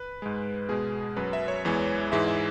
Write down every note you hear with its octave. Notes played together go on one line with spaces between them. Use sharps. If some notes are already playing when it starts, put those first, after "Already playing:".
Already playing: B4
G#2 G#3
B2 G#3 G#4
F#2 F#3 B4
E5
C#5
E2 E3 G#3
G#2 E3 G#3 E5
E5